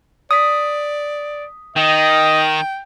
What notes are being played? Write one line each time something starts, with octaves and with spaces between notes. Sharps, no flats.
D5 D#6 B6
D#3 D#5 G5